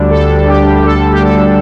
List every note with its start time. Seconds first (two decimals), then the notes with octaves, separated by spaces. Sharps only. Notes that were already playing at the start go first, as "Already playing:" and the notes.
Already playing: D2 D3 G3 D4
0.10 A4
0.48 G4
0.85 A4
1.11 G4
1.23 A4